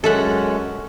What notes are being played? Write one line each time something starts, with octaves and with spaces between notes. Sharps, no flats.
F#2 G#3 C#4 A4 E5 F#5